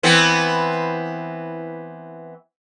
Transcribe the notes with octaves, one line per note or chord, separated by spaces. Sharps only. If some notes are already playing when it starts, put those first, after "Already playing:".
E3 B3 C4